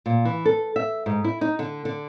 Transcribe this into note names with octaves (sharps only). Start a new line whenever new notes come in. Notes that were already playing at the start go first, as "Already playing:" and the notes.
A#2
E3
A4
E5
G#2
E4
D#4
D3
D3